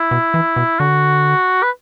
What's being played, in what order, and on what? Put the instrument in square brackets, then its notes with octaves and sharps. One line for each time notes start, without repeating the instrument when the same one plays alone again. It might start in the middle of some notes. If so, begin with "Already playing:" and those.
Already playing: [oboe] E4
[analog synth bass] B2
E3
B2
[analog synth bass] D3 [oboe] F#4
[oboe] B4